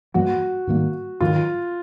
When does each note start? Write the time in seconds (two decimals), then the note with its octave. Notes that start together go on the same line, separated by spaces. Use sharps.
0.14 G2 E3 G3 A#3 F#4
0.67 G#2 D#3 G3 A#3
1.21 G#2 D#3 F#3 F4